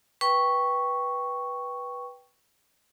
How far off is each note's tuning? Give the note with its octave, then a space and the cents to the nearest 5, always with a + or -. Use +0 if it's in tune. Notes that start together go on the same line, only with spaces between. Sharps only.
B4 -10 G5 +0 C#6 +0